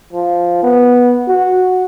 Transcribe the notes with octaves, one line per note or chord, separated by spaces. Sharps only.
F3
B3
F#4